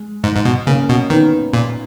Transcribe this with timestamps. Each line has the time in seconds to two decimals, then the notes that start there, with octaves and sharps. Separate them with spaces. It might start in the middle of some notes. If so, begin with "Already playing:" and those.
Already playing: G#3
0.24 G#2
0.35 G#2
0.45 B2
0.67 C#3 A#3 C#4
0.89 B2
1.10 D#3 B3 D#4
1.53 A#2